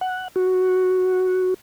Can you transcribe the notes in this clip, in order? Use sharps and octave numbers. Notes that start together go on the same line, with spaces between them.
F#5
F#4